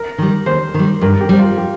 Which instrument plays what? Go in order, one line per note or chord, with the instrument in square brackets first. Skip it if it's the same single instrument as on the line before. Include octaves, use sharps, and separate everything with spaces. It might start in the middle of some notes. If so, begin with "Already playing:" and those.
Already playing: [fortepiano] A#4
[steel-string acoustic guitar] D#3 G3
[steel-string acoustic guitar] D#2 [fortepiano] C5
[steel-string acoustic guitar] D#3 G3
[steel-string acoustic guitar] G2 [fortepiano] A#4
[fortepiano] G4
[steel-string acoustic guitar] G3 C4
[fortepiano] F4
G4